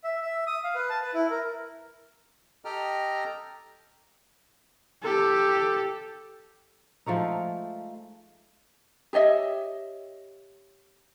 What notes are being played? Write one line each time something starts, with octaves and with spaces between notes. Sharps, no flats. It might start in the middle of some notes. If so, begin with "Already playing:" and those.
E5
E5
D#6
F5
B4
A5
B4
E4
A#4
G4 A4 D#5 G5 A#5 F6
G4 A4
F3 G#3 A3 D#4
G4 C#5 D#5 E5